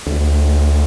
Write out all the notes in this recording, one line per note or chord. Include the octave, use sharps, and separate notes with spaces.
D2